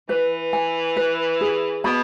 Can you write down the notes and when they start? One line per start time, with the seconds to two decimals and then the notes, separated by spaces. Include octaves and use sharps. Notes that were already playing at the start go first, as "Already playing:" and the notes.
0.09 E3 B4
0.53 G#5
0.96 B4
1.41 G#4
1.84 B2 B5